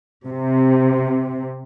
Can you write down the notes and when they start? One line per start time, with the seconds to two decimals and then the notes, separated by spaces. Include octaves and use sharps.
0.27 C3